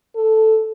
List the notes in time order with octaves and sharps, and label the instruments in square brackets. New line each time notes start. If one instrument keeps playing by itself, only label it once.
[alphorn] A4